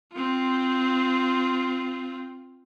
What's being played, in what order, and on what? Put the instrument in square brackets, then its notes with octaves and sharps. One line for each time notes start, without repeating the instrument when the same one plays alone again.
[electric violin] C4 F4